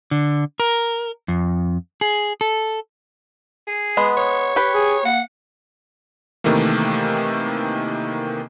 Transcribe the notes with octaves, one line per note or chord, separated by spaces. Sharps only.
D3
A#4
F2
G#4
A4
G#4
G#3 B3
C#5
G4 B4
G#4
A#3 F#5
C3 D#3 E3 A3 A#3